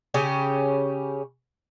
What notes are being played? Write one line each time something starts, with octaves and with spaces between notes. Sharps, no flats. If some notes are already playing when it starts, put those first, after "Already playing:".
C#3 C#4 G4